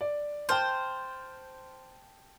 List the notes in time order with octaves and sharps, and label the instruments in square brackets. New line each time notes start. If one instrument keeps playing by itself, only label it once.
[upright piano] D5
[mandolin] C5 [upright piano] G5 A5 F6